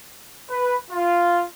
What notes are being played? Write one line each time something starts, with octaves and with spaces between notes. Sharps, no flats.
B4
F4